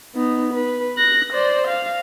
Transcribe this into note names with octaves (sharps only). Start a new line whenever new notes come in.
B3 D#4
B4
F#6 A#6
C5 D5
F5